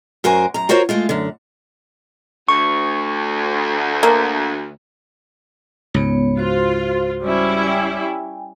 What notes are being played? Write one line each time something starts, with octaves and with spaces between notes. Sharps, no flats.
F#2 F#4 A#4 C5 G#5
F#2 A#5
F4 F#4 A#4 C5 C#5
G#3 A3 F4
F#2 D3
D2 C#6
A#3
C#2 G#2 B3 C#5
F4 F#4 C5
G3 C#4 E4
G5 G#5